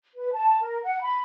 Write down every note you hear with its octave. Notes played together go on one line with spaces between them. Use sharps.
B4
A5
A#4
F#5
B5